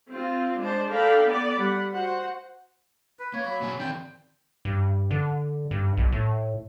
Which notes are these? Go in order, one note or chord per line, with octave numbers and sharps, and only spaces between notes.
C4 F4
G#3 D4 C5 A5
D4 A4 A#4 F5 G5 B5
B3 D5
G3 F#5 B5
F#4 C5 F#5
B4
A#3 C#5
F#3 B5
B2 D4 G#5
D#3 C4 D5 G5
G2
D3
G2
B1
A2